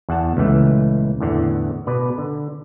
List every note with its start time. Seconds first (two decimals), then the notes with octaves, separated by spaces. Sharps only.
0.09 E2 F#5 A5
0.37 C#2 A#2 E3 A3
1.20 E2 A2 D3 E3
1.87 B2 B4 D5
2.18 D3